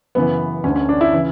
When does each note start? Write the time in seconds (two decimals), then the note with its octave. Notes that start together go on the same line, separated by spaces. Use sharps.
0.15 F#2 C#3 E3 B3
0.64 D2 D3 C#4
0.76 C#4
0.89 D4
1.01 E4
1.13 C#3 E3